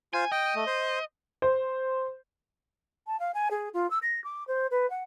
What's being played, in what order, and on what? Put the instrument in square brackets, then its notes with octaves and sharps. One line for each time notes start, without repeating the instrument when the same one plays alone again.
[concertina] F4 C5 [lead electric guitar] G#5
[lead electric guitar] D#5 [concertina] G5
[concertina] A3
C5
[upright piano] C5
[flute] A5
F5
G#5
G#4
F4
E6
A#6
D6
C5
B4
F#5